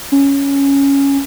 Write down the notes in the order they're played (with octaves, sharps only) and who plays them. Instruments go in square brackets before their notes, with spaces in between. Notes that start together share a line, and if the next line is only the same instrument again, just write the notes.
[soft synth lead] C#4